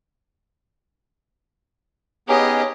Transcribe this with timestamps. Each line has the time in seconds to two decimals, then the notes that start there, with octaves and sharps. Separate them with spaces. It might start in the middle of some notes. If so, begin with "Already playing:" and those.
2.28 B3 C#4 D#4 G4 G#4 C#5 D#5